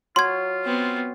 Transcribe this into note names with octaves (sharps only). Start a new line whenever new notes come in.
F#3 F4 C6 G#6
B3 C4